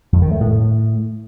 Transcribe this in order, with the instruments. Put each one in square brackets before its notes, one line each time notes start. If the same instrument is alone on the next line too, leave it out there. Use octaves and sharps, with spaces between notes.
[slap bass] F2
D#3
A3
A2